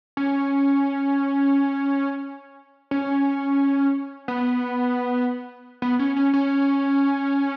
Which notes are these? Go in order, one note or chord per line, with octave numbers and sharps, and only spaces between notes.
C#4
C#4
B3
B3
C#4
C#4
C#4